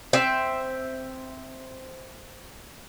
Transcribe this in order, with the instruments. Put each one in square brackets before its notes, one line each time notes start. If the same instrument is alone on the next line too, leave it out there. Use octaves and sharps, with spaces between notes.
[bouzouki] C4 E5